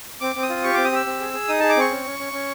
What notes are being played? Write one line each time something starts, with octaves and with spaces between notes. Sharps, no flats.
C4 D6
C4
D#6
F4
G4 C#6
C4 D6
D#6
G4 E6
C4
G#4
G#4
D#4 D#6
G#4 A5
D6
C4 C#6
C#4
C#4
C#4
C#4